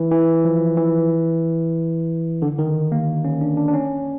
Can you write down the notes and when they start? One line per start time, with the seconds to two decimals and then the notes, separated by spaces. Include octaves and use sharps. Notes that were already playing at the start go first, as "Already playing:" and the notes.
Already playing: E3
0.11 E3
0.45 F3
0.78 E3
2.42 D3
2.59 D#3
2.92 A#3
3.25 C#4
3.41 D4
3.57 D4
3.68 D4
3.74 C#4